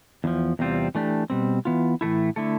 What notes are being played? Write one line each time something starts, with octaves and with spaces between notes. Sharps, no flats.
E2 D3 F3
E2 C3 G3 C4 F4
E3 A3 D4 G4
B2 G3 C4
E3 B3 F4
A2 E3 A3 E4
D3 A3 E4 A4